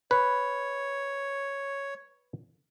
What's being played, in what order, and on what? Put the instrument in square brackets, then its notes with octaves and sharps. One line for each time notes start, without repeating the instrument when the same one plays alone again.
[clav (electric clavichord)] B4 [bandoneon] C#5